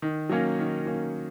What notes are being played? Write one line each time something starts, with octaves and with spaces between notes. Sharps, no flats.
D#3
F#3 A#3 C#4
D#3
F#3 A#3 C#4